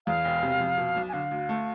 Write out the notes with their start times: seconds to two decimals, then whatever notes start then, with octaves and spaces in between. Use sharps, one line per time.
0.07 E2 F5
0.24 E1
0.43 C3
0.60 F2
0.78 B2
0.96 B1
1.09 G#5
1.13 D3 F5
1.31 D2
1.49 A3